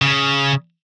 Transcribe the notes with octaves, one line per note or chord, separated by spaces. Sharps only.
C#3